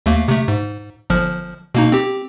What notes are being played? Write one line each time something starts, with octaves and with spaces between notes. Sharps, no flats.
D#2 A3 A#3
C3 A3
G#2
G1 F3 F6
B2 A#3 D#4
C4 G4